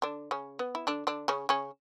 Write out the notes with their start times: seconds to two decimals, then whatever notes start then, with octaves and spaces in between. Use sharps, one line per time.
0.02 D3 D4
0.31 C#3 C#4
0.59 B3
0.75 E4
0.87 D3 D4
1.07 D3 D4
1.28 C#3 C#4
1.49 C#3 C#4